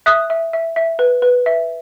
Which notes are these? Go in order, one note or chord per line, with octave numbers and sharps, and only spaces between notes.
E5 D#6 F#6
E5
E5
E5
B4
B4
E5